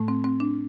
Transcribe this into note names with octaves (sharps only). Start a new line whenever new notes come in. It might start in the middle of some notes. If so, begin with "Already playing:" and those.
Already playing: A2 A3
C4
C4
D4